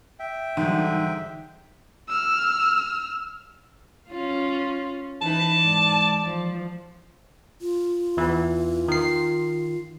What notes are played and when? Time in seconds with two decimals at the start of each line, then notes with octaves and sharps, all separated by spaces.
0.19 E5 G5
0.57 G#2 D3 E3 F#3 G3
2.08 E6 F6
4.09 C#4 F4
5.22 E3 D#4 B4 A5
5.58 G#2 D5
6.27 F3
7.61 F4
8.17 E2 E3
8.88 D#3 C7